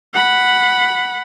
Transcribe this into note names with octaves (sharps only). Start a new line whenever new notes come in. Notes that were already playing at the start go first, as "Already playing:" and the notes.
F#5 B5